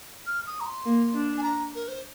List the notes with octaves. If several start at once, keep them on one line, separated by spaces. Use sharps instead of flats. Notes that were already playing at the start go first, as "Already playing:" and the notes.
F6
D#6
A#5
C6
A#3
D4
G#5
A#5
A#4
C5